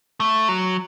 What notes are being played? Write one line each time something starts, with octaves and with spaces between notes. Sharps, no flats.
A3
F#3